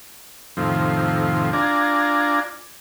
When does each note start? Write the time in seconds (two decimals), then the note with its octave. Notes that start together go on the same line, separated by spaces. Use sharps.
0.57 F2 A2 C3 D#3 F3
1.53 D4 F4 D5 G#5 A#5